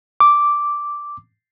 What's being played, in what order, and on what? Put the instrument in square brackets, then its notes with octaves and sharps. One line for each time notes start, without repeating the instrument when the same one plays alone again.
[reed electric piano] D6